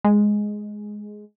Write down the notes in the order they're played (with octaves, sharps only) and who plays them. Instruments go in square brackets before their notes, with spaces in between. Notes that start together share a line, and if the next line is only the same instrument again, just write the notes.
[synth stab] G#3